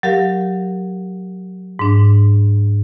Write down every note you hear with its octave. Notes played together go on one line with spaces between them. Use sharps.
F#3 G4 A#4 F5
G#2 D4